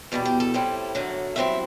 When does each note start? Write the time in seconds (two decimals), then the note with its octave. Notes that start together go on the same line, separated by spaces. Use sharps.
0.12 E2 B2 G3 D5
0.25 G4
0.40 A4
0.54 A2 G3 C4 E4
0.95 F#2 D3 F#3 A3
1.36 G2 F#3 C4 E4 E5